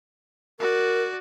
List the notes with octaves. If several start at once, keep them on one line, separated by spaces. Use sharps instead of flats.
F#4 A#4 D5